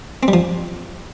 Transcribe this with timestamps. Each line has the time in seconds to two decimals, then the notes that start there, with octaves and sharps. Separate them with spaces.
0.23 C4
0.28 G3
0.33 F3